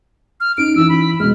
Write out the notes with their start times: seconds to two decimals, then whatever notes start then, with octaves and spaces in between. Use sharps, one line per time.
0.40 F6
0.57 C#4 D#4 D7
0.76 E3 C#4 E4 E6
0.89 B5
1.20 B2 G#3 F6